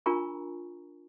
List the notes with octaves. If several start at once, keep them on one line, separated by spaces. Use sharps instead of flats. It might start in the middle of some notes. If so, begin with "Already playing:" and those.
D4 F4 A#4 G#5 A#5 C#6